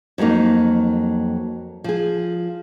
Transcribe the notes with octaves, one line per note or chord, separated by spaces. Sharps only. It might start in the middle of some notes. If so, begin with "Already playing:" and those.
F2 F#3 G3 A#3 D#4
F3 G#4